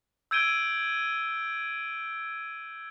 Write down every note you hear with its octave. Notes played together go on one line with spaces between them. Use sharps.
E6 G6 G#6 D7 D#7 G7